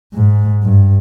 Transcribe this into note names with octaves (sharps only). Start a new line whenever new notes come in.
G#2
G2